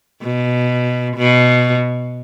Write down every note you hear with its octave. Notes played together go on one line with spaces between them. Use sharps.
B2
B2